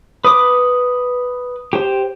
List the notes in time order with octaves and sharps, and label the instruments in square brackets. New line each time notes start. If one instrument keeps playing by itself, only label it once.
[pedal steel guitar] B4 D6 [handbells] D#6
[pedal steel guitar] G4 C5